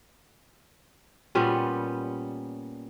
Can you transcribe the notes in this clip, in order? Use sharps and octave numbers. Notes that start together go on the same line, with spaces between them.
A#2 G3 B3 C#4